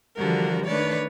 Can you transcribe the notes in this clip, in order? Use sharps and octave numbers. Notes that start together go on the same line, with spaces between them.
D3 E3 F3 G3 F#4 A#4
D#3 A3 D4 B4 C#5 D5